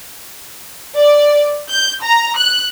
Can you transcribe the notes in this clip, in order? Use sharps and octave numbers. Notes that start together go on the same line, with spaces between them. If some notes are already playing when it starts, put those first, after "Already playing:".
D5
G6
A#5
F#6